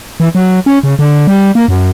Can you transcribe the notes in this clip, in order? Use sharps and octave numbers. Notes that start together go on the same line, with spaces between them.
E3
F#3
C#4
C#3
D3
G3
A#3
F#2